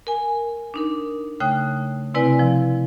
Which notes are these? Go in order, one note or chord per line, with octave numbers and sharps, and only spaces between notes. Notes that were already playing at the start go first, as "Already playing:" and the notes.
A#4 G#5
D4 D#4 A#4
C#3 A3 G5 D#6 F#6
C3 C4 E4 B4 D5 G#5
F3